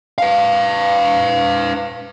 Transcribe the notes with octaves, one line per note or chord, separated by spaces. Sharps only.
B4 F5